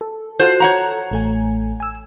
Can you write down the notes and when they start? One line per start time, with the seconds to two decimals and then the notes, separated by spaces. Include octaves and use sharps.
0.01 A4
0.40 F4 F#4 A4 C5 F#6
0.60 C#5 F#5 A#5
1.11 A1 A3 G#5
1.80 G#5 E6